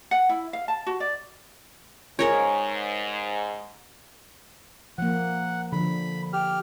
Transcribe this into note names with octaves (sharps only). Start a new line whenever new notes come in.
F#5
E4
F5
A5
F#4
D5
G#2 G#4 A#4 C#5
F3 A#3 F#5
D3 F3 B5
G4 F6